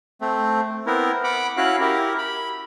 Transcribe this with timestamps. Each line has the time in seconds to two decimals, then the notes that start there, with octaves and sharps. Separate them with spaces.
0.21 A3 C4
0.86 B3 C4 E4 A#4
1.24 F#5 B5 D6
1.57 C#4 E4 F#4 F5 F#6
1.81 E4 G4 A#4
2.18 B5